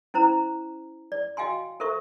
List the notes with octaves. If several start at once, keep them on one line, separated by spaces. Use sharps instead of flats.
C#4 E4 C5 A#5
D5
F#4 D#5 F5 G5 G#5 C6
A4 A#4 C5 E5 C#6